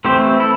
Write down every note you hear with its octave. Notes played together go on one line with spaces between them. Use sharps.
E3 A3 C4 G4 C5
E4 A4